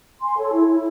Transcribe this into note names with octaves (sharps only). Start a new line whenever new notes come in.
G#5 C6
A4 C#5
E4
E4